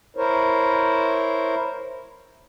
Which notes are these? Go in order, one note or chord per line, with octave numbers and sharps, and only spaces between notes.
E4 A#4 C5 C#5